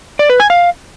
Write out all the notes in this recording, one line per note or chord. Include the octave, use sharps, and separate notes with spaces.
D5
B4
G#5
F5